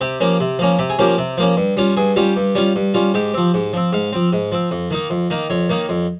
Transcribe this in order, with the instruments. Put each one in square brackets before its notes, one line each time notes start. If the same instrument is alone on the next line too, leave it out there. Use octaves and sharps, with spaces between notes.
[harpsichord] C3 G4
F3 A#3 C#4
C3
F3 A#3 C#4
C3 G4
G#4
F3 A#3 C#4 G4
C3
F3 A#3 C#4
G2
G3 C#4 F4
G2 G#4
G3 C#4 F4 G4
G2
G3 C#4 F4
G2
G3 C#4 F4
G#2 G4
F3 C4
G#2
F3 C4
G#2 F5
F3 C4
G#2
F3 C4
F2
D#3 A#3 D#4
F2
D#3 A#3 D#4
F2 C#5
D#3 A#3 D#4
F2